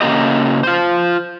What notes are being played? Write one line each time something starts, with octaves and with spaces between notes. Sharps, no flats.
C#3 A#3 G4 D#5
F4 C5